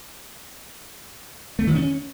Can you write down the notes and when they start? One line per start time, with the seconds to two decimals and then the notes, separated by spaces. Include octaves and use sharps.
1.59 A3
1.67 D#3
1.75 C#4